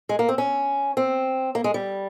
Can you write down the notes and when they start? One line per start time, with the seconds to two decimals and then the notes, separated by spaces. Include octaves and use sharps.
0.09 G#3
0.19 A#3
0.29 C4
0.38 C#4
0.97 C4
1.55 A#3
1.64 G#3
1.74 G3